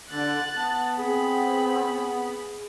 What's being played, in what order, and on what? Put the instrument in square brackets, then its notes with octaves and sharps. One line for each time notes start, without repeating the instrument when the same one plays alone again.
[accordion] D3 [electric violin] F#6 A6
[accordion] B3 [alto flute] A5
[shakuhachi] C4 [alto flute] G#4 [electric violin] B5